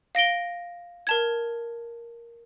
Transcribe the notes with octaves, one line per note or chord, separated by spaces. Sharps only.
F5 A#6 D7 G7
A#4 A5 G#6